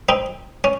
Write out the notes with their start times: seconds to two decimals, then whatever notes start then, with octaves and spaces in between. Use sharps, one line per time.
0.09 C4 D#4
0.64 C#4